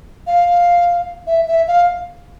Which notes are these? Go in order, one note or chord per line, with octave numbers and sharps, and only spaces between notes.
F5
E5
E5
F5